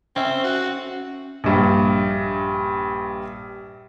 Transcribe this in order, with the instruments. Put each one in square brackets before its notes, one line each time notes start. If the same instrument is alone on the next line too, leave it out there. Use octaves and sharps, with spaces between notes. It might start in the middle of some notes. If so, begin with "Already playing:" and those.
[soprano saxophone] C4 [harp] C#4 E5
[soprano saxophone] F#4
[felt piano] A#1 G2